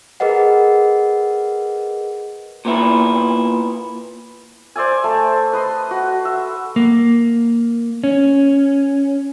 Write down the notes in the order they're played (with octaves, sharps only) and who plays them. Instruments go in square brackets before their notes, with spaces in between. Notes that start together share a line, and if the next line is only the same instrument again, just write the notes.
[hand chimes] G#4 A#4 B4 D#5 F#5
[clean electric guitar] A#2 B3 E4
[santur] C5 D5 E5 G#5
A3
B4 D#5 C6
F#4
E5
[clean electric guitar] A#3
C#4